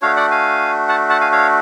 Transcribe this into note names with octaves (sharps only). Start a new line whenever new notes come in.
A3 D4 F#4 C#5 F5
D5 F#5
F5 G#5
F#5 A5
F#5 A5
F5 G#5
C#5 F5